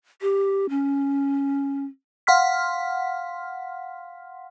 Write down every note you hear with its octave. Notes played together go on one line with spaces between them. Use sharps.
G4
C#4
F5 F#5 C6 F6 B6